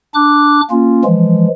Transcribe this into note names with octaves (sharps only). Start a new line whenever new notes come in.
D4 D6 F#6
A#3 C#4 F4
E3 F3 G#3